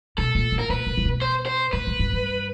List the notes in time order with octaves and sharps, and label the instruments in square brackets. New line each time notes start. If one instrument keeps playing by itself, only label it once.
[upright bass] B2 [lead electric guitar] A4
[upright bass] A#2
A#2
[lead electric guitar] A#4
[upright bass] A#2 [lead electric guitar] B4
[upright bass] B2
A#2
B2
[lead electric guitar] C5
C5
[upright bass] A2 [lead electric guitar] B4
[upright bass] A2
G#2
G2